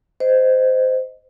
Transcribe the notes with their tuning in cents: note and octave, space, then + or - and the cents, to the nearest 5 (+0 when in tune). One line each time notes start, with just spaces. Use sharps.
C5 -15 D#5 +0